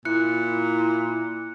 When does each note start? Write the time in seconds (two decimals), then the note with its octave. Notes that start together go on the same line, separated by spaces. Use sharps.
0.05 A#2 E4 F#6 C#7